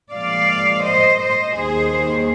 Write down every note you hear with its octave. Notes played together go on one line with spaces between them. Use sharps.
A#2 F3 G#3 D5 F5
C5 D#5
C5 D#5
D#2 D#3 G3 G#4 C5